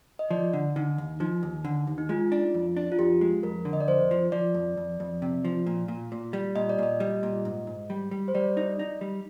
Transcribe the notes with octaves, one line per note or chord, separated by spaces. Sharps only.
D#5
F3 D5
D3
D3 D#4
D#2
F3 D#4
D#2
D3
D#2
D#4
G#3 F4
D4
F2
D4
F4
F2 G4
G#3
F2 A#4
D3
D#5
D5
F2 C5
F3
F3 D5
F2
F2
F2
C3
F3
A#2
A#2
A#2
G3
A#2 D#5
D5
A#2 D#5
G3
A#2
G#2
G#2
G3
G3
C5
G3 D5
D#4
D#4
G3